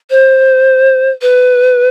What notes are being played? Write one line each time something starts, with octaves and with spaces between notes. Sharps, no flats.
C5
B4